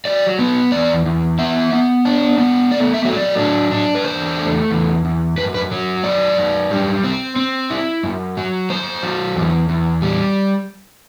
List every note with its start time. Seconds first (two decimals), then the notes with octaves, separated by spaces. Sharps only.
0.05 F#3 D5
0.39 B3
0.72 E2 D5
1.05 E2
1.38 B3 E5
1.73 B3
2.05 D4
2.38 B3
2.71 A3 D5
2.94 E5
3.05 F#3
3.17 D5
3.38 D4
3.71 D4
3.95 B4
4.04 E2 C5
4.37 A3
4.71 E2
5.05 E2
5.38 F#2 B4
5.54 B4
5.71 F#3
6.04 F#2 D5
6.38 F#2
6.71 G3
7.04 C4
7.36 C4
7.70 E4
8.03 F#2
8.37 F#3
8.69 F#2 C5
9.03 F#3
9.36 E2
9.69 E2
10.02 G3